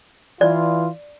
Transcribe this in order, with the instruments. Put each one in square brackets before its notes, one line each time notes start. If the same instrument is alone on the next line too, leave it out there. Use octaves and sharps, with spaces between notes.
[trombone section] E3 F4 [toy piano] D5